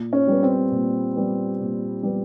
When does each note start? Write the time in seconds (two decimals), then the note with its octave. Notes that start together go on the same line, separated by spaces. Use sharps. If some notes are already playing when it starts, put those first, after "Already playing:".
Already playing: A#2
0.13 C#4
0.27 G3 B3
0.43 C4
0.71 A#2
1.16 G3 B3
1.59 A#2
2.03 G3 B3